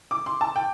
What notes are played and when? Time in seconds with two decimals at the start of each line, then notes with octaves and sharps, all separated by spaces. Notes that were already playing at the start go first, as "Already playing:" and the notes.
0.11 D6
0.26 C6
0.41 A5
0.56 G5